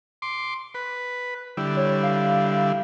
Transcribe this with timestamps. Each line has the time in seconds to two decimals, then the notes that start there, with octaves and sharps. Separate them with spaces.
0.22 C6 D6
0.74 B4
1.57 D3 G3 E4
1.77 C#5
2.03 F5